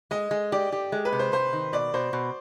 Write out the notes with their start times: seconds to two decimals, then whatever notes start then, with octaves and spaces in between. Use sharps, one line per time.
0.11 G#3 D#5
0.31 G#3
0.52 G4 D5
0.72 G4
0.92 G#3
1.05 B4
1.13 C3
1.19 C5
1.32 C3 C5
1.53 D#3
1.73 B2 D5
1.94 B2 C5
2.13 B2